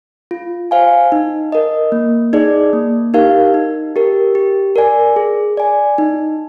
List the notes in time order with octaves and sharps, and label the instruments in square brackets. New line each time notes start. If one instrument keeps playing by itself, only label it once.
[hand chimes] F4
C5 F5 G#5
D#4
A#4 D#5
A#3
D#4 G#4 D5
A#3
D#4 G4 A#4 F5
D#4
G4 A#4
G4
A#4 D5 G#5
G#4
D5 G#5
D#4